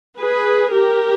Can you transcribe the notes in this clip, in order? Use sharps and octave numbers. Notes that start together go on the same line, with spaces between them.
G#4 B4
G4 A#4